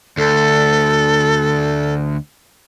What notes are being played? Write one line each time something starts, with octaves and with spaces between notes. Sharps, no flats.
D2 A4